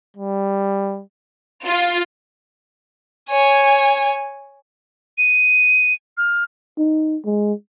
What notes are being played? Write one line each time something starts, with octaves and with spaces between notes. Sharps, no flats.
G3
F4
C#5 G#5
D#7
F6
D#4
G#3